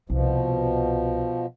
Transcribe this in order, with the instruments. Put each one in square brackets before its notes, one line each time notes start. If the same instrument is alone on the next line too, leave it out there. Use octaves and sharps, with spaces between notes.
[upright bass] C2 [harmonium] B2 F3